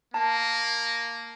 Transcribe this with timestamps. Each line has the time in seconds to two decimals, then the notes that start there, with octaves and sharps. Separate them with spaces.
0.14 A#3 A5